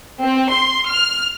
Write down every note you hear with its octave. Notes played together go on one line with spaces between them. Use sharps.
C4
C6
F6